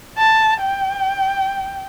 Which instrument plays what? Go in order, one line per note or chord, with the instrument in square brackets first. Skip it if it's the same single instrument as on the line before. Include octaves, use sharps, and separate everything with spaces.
[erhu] A5
G5